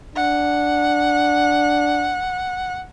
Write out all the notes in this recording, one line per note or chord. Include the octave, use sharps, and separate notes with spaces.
D4 F#5